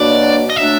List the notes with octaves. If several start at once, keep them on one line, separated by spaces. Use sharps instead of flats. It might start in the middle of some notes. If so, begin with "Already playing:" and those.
Already playing: B2 F#3 A#3 D4 D5
D#5
F#3 A3 D4 E5